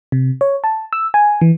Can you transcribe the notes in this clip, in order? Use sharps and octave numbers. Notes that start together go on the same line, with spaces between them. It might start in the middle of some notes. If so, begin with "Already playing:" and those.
C3
C#5
A5
E6
G#5
E3